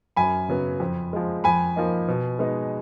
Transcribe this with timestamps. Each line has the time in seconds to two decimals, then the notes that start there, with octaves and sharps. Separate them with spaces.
0.17 F#2 G#5 B5
0.48 C#3 F#3 B3
0.80 F2
1.13 F3 G#3
1.44 F2 G#5 B5
1.76 F3 A#3 D#4
2.08 B2
2.39 G#3 B3 D#4